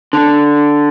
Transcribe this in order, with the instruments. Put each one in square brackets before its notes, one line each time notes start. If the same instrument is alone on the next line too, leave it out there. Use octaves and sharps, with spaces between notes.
[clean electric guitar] D3